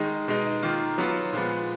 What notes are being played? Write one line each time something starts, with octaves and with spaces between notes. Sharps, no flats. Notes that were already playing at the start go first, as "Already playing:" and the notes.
Already playing: D#3 G#3 D#4
B2 G#3 D#4
D#3 A#3 F4
F#3 B3 F4
A#2 F3 G#3 B3